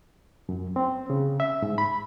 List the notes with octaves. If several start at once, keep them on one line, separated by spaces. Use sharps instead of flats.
F#2
C4
C#3
E5
G#2
B5